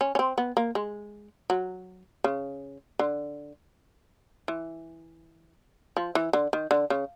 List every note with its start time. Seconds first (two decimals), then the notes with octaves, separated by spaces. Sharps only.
0.01 C#4
0.15 C#4
0.19 C4
0.38 B3
0.57 A#3
0.75 G#3
1.50 F#3
2.24 C#3
2.99 D3
4.48 E3
5.97 F3
6.15 E3
6.33 D3
6.53 D#3
6.71 D3
6.90 C#3